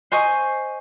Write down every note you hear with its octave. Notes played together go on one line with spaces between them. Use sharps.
C5 D#5 G#5 C#6